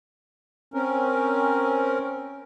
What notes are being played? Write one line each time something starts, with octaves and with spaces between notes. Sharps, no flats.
C4 C#4 A#4